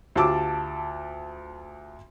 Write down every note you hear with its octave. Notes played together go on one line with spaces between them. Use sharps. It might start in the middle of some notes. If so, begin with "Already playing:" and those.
D2 F4 G4 A5 D6 E6